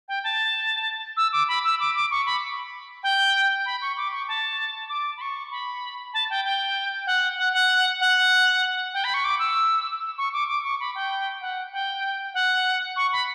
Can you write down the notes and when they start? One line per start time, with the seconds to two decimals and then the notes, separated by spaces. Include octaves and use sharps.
0.08 G5
0.24 A5
1.17 E6
1.33 D6
1.48 B5
1.64 E6
1.80 D6
1.95 D6
2.11 C#6
2.26 B5
3.03 G5
3.66 B5
3.82 C#6
3.97 D6
4.12 C#6
4.28 A5
4.89 D6
5.17 B5
5.21 C#6
5.51 B5
6.14 A5
6.30 G5
6.45 G5
7.06 F#5
7.38 F#5
7.53 F#5
8.01 F#5
8.94 G5
9.04 B5
9.14 C#6
9.24 D6
9.39 E6
10.18 C#6
10.33 D6
10.48 D6
10.64 C#6
10.80 B5
10.95 G5
11.41 F#5
11.72 G5
12.34 F#5
12.96 C#6
13.13 B5